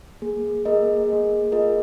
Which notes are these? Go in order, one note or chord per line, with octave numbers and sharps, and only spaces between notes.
A#3 G#4
A#3 G#4 A#4 D#5
A#3 G#4
A#3 F4 G#4 A#4 D#5